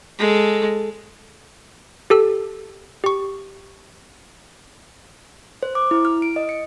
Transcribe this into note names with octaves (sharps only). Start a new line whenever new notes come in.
G#3 A4
G4 A4 E6
G4 C#6
C5
D6
E4
F6
D7
D#5
C#7